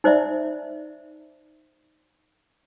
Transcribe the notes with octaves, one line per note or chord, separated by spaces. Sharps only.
D#4 C5 D5 E5